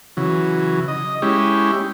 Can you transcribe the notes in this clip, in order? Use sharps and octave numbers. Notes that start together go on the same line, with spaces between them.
C#3 E3 F#3
D#5
G#3 C#4 E4 G4